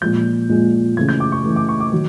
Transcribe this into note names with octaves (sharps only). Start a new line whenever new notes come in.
A#2 F3 G#3 G6
A#2 F3 G#3
C#3 E3 A3 G#6
G6
D6
C#6
C#3 E3 A3
D6
C#6
D6
D#3 F#3